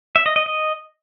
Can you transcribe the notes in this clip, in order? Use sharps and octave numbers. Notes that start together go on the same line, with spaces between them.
E5
D#5
D#5
D#5